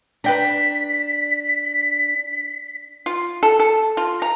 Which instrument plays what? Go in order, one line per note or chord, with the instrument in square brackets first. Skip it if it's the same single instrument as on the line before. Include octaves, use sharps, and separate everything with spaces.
[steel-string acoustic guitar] D4 [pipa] B4 G5 A#5 [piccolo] B6
[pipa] F4
A4
A4
F4
A#5